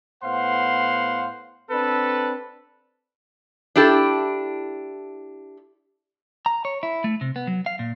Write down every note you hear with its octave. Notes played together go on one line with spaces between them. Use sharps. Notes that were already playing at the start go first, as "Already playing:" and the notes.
A2 B3 C5 F5 F#5 C6
C4 D4 A4 B4
D4 E4 G4 A4
A#5
C#5
E4
A3
C3
B3
F#3
F5
A#2